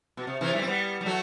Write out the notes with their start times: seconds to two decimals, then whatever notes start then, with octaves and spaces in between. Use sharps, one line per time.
0.17 B2
0.27 C3
0.41 C3 E3
0.54 E3 G3
0.62 C4
0.67 G3 B3
1.01 G3
1.06 F#3 A3